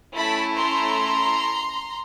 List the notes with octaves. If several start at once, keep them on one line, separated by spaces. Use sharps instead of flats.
A3 C#4 E4 A4 A5 B5
A#5 C6